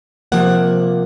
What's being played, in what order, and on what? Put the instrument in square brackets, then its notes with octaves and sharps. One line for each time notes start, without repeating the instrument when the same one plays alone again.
[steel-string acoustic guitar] C3 F3 A#3 F#5